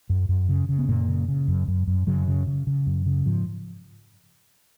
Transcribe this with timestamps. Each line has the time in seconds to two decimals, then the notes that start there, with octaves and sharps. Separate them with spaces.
0.10 F#2
0.29 F#2
0.49 C#3
0.69 C#3
0.79 B3
0.88 F#2 A#2 A#3
1.08 C#3
1.28 C#3
1.48 F#2
1.68 F#2
1.87 F#2
2.07 F#2 C#3 F#3
2.27 C#3
2.47 C#3
2.67 C#3
2.87 F#2
3.06 C#3
3.26 G#2 F3